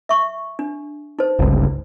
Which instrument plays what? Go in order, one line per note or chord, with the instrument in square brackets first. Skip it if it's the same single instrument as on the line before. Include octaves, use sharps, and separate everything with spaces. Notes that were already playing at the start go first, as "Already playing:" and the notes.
[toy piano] E5 C#6
D4
D#4 C5
[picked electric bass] G1 C#2